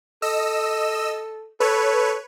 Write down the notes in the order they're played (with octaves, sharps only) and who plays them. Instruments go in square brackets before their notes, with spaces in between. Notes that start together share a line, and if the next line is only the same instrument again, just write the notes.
[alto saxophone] A4 [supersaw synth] D#5 E6
[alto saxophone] A4 [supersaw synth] B4 C#5